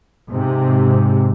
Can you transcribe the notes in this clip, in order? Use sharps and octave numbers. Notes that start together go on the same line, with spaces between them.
G#2 C3